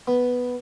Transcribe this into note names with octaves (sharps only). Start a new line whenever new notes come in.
B3